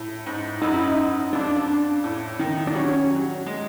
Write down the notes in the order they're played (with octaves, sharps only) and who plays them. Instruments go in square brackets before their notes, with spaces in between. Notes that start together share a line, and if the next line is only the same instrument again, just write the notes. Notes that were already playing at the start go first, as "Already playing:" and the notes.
Already playing: [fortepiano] A2
G#2
[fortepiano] F#2 [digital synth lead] D#4
[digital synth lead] E4
D#4
[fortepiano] F2 [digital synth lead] D4
[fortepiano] A2
D#3
[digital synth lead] D4
[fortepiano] F#3 [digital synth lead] C#4
[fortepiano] F#3
G#3